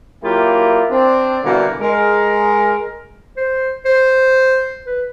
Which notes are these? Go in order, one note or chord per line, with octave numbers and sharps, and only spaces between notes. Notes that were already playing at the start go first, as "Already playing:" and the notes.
F#3 A#3 E4 F4 G4
C4 D4
B2 D3 E3 G3 A#3
G#3 A#4
C5
C5
B4